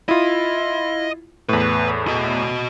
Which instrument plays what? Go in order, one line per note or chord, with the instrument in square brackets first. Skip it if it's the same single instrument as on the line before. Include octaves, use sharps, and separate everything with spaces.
[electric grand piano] E4 F4 [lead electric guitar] D#5
[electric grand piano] E2 A2 [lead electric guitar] B4
[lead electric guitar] F#4 D#5